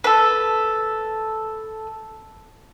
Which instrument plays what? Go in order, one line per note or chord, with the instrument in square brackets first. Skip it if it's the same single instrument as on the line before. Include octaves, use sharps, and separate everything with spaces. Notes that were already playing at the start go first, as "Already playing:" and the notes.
[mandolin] A4 B4